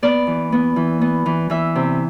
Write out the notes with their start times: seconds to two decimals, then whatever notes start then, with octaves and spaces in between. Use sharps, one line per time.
0.03 B3 D5
0.27 E3
0.52 B3
0.76 E3
1.01 B3
1.26 E3
1.50 E3 E5
1.75 C3